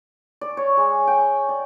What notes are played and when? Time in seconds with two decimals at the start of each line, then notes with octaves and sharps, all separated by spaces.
0.41 D5
0.57 C#5
0.77 G#3
1.07 G5
1.49 D5